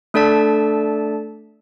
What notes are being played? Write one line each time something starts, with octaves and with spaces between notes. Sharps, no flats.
A3 D4 A4 D5 A5 B6